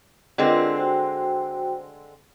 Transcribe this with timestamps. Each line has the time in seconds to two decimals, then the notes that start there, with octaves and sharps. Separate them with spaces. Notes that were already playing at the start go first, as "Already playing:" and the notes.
0.38 D3 G#3 C4 F4 A#4 B4
0.76 F#4 C5 G5